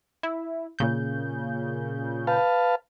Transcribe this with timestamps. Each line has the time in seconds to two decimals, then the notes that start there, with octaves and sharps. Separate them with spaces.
0.23 E4
0.79 A#2 C#3 G6
2.27 B4 F5 A5